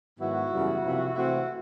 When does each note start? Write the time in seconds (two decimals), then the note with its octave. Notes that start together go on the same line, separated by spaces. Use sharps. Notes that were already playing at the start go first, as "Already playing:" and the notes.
0.19 G#2 D#3 F#3 B3 E4 F#4
0.51 F#2 C#3 E3 G3 B3
0.84 C3 F3 A#3
1.15 C3 E3 A3 C4 E4 F#4